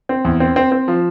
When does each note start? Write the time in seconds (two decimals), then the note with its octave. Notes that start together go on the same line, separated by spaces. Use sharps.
0.09 C4
0.25 E2
0.40 C4
0.56 C4
0.72 C4
0.88 F3